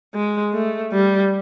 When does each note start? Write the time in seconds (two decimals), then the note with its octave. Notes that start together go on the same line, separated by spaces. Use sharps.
0.15 G#3
0.54 A3
0.93 G3